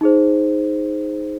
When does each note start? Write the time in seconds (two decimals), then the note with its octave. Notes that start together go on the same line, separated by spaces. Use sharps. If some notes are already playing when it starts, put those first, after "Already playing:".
0.01 D#4 G#4 C5